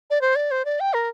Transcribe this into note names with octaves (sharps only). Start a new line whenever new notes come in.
D5
C5
D5
C5
D5
G5
A#4